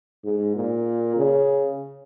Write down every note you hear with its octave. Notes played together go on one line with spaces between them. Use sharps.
G#2
A#2
C#3